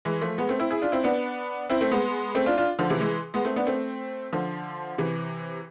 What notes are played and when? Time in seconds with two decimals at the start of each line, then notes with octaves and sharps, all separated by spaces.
0.05 E3 G#3
0.22 F3 A3
0.38 G#3 B3
0.49 A3 C4
0.59 C4 E4
0.71 E4 G#4
0.82 D4 F4
0.92 C4 E4
1.03 B3 D4
1.69 C4 E4
1.81 A3 C4
1.91 G#3 B3
2.35 A3 C4
2.46 D4 F4
2.58 D4 F4
2.79 D3 F3
2.90 C3 E3
3.01 E3 G#3
3.34 G#3 B3
3.45 A3 C4
3.56 B3 D4
3.67 A3 C4
4.33 D3 F3
4.98 C3 E3